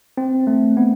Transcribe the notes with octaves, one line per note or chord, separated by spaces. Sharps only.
C4
A3
B3